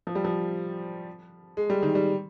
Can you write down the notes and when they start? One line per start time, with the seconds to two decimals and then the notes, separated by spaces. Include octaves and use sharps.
0.07 F3
0.15 G3
0.24 F3
1.57 G#3
1.70 G3
1.83 D#3
1.95 G3